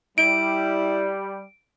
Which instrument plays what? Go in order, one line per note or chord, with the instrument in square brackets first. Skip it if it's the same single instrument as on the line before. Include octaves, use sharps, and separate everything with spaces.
[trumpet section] G3 [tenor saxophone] E4 [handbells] D7